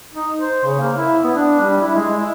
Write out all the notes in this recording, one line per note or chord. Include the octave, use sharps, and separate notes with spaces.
D#4
C5
C#3
A#3
E4
B3
D4
G3
E4
G#3
E4